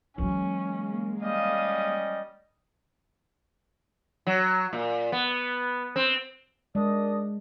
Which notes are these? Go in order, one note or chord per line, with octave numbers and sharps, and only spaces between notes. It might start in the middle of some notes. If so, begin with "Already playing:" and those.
E3 F#3 G#3 A#3 C#4
G3 C#4 D#5 F5 D#6
F#3
A#2
B3
C4
G#3 D4 A#4 D#5